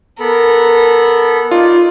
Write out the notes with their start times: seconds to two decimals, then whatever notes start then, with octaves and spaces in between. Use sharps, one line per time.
0.20 B3 A4 A#4 B5
1.51 D#4 F4 D5